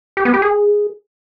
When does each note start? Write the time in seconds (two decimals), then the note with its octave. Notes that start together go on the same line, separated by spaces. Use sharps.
0.17 G4
0.25 B3
0.34 G4
0.42 G#4